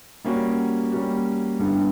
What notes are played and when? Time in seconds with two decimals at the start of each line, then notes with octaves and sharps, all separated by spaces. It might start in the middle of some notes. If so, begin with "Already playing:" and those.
0.25 G3 A#3 C#4 F#4
0.92 G3 A#3 C#4 F#4
1.60 G2 D3 G3 B3 E4